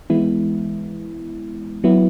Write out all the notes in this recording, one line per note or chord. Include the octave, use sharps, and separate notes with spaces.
E3 G#3 B3 E4
F#3 B3 E4